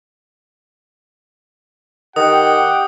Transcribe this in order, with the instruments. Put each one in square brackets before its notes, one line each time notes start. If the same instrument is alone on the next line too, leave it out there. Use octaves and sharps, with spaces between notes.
[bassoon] D#3 [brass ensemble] G4 G5 [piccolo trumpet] F#5 [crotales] D#6